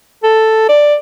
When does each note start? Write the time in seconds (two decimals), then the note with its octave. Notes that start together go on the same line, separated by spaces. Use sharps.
0.23 A4
0.69 D5